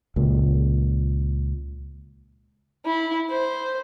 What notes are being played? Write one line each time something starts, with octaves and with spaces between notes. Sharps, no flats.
C#2 A#2
E4
C5